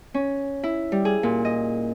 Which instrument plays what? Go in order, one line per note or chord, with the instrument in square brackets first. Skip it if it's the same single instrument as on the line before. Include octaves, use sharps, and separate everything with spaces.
[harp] C#4
E4
G3
G#4
A#2
D#5